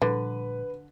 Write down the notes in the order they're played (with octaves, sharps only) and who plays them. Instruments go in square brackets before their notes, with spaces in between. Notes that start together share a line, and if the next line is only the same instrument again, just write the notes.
[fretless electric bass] A#2 F3 G3 [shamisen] D3 [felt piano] B4